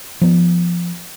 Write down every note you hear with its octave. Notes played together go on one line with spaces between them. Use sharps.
F3 B3